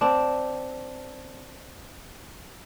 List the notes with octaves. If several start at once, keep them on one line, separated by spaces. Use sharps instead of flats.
C4 D4